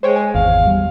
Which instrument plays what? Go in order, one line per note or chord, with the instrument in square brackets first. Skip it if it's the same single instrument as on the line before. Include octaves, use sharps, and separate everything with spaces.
[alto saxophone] G#3 [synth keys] C5 C#5 G5
[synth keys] G#5
[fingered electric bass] G#1 [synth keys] E2 [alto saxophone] F5
[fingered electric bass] G3